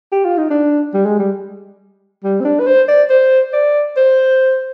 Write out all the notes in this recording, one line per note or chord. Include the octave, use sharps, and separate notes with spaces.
G4
F4
D#4
D4
G3
G#3
G3
G3
C4
D4
B4
C5
D5
C5
D5
C5